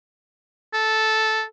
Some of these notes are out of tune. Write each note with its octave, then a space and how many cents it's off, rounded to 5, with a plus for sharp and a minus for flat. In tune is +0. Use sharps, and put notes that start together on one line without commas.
A4 -5